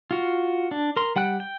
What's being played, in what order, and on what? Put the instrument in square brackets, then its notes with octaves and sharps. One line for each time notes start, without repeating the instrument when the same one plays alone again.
[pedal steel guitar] F4 F#4
D4
A#4 C6
G3 F#5 G5 F#6
G5